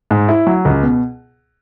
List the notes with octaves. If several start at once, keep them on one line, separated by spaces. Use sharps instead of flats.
G#2
E4
F#3
C#2
B2